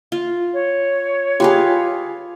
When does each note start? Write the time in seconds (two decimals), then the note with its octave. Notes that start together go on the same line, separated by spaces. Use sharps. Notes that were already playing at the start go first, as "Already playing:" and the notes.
0.12 F4
0.53 C#5
1.40 F4 G4 G#4 B4 F5